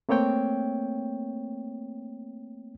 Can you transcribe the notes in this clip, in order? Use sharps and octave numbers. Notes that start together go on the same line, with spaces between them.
A3 A#3 C4 C#5 G5